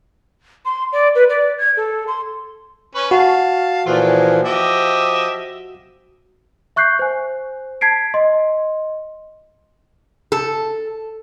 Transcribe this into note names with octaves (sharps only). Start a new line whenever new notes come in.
C6
D5
B4
D5
G#6
A4
C6
C#4 B4 C#6
F#4 F5 A5
A#2 E3 F3 A3 F4
G#3
F3 G4 D#5 E5
E5 C#6 F#6 G6 C7
C5 G#5
A5 G#6 B6 C7 D7
D#5 C6
A4